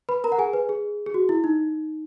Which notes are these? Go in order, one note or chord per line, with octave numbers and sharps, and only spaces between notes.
B4 B5
A#4 A#5
F#5
G#4 G#5
B4
G#4
G#4
F#4
E4
D#4